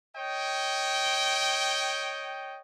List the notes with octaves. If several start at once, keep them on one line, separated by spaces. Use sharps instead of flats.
C#5 D#5 G5